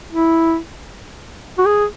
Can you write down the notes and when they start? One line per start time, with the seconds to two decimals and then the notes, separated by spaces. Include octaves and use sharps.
0.11 E4
1.58 F#4
1.65 G#4